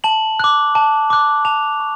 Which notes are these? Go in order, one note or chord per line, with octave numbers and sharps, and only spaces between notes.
A5 F#7
D6 F#6
A5
D6 F#6
A5 F7
C#6